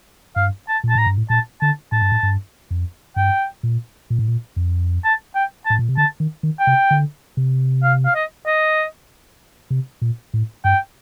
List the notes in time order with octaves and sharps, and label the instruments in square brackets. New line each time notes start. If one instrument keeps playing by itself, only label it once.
[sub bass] G2 [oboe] F5
[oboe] A5
[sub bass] A#2
[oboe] A5
[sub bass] A2 [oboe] A#5
[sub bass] G2
A2
[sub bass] A#2 [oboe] A5
[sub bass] D3 [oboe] A5
[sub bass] A2 [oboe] A5
[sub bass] G2
A2
G2
F2
[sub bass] G2 [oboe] G5
[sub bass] A#2
A#2
A2
A#2
F2
[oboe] A5
G5
A5
[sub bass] A2
A#2
C3
[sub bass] D3 [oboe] A5
[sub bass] D#3
D#3
[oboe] G5
[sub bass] C3
D3
C3
[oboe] F5
F5
D#5
D#5
[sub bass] C3
A#2
A2
[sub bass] G2 [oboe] G5